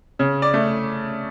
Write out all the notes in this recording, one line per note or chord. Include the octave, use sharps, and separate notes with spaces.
C#3
D5
A3